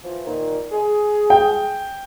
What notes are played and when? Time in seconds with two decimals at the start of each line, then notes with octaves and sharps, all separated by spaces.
0.04 E3 F3
0.26 A#2 D#3
0.72 G#4
1.30 G5